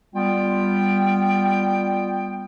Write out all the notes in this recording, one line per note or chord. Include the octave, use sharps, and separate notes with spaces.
G3 B3 F4 G5